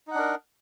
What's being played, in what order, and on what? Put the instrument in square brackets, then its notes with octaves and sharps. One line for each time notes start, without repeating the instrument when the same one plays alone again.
[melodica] D#4
F#5
D4
A#4